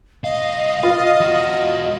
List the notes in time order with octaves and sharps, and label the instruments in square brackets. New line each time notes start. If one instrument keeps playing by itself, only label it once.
[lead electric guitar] C2 F5 [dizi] D#5
[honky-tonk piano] F4 [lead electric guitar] F5
[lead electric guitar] E2 F#4